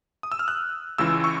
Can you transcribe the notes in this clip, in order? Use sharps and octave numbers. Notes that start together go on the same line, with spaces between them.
D#6
E6
F6
F#6
C#2 C#3 E3 G#3 E6
C#6